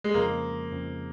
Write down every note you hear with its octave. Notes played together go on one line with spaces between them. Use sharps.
G#3
F2 C#3 F3 A#3
F2 C#3 F3